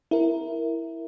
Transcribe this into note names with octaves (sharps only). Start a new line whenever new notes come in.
E4 A#4